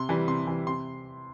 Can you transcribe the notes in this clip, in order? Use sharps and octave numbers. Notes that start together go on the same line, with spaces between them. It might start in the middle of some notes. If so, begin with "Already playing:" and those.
Already playing: C3 C6
E3 G3
C3 C6
E3 G3
C3 C6